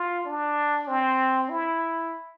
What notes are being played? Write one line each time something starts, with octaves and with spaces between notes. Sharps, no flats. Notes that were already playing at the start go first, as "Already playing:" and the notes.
Already playing: F4
D4
C4
E4